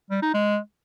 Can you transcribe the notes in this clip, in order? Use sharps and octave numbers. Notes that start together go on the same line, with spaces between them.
G3
D#4
G#3